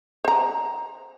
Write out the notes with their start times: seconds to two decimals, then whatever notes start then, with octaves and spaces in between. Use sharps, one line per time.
0.25 C5 A#5